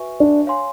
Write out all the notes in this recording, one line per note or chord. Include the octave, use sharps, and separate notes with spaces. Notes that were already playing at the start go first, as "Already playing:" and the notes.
Already playing: F#4 B4 E5 G#5 C#6
D4
C#5 F5 G#5 C6